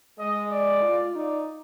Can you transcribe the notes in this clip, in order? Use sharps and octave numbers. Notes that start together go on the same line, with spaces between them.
G#3 D#5
D5
F4
D#4 D5